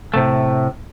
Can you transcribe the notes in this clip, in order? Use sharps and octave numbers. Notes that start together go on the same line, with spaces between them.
A2 C3 A3